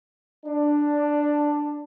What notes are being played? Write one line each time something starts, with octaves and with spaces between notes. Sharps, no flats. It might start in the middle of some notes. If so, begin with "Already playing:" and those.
D4